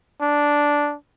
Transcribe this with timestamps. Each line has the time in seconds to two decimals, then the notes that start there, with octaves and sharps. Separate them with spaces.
0.22 D4